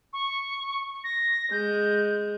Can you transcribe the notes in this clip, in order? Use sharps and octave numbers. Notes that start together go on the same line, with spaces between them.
C#6
A#6
G#3 G6